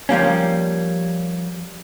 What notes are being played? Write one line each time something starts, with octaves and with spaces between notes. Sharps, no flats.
F3 G3 A#3 C#4